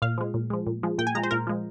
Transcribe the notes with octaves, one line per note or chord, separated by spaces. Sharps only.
A#2 F5
F3 G#3
A#2
F3 G#3
A#2
F3 G#3
A#2 G5
G#5
F3 G#3 A#5
C5
A#2 A#4
F3 G#3